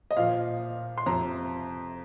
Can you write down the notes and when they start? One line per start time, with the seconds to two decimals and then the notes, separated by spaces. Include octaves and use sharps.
0.11 D#5
0.16 A#2 F3 F5
0.98 C6
1.06 F2 C3 F3 A#5